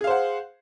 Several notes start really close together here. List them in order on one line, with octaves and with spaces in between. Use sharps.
G#4 F5 C5 F#5